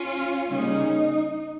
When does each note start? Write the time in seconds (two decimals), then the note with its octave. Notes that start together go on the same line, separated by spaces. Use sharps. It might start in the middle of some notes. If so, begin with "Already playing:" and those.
Already playing: C#4 F4
0.49 C#3 G3 A#3 C#4 D#4